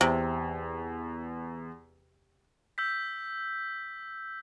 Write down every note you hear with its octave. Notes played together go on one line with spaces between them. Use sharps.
E2 C3
E6 G6 B6